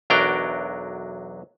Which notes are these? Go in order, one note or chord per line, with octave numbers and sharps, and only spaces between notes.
B1 E2 F#3 D4 A#4 G5